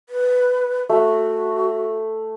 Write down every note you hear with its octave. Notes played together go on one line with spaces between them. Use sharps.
B4
A3 F#4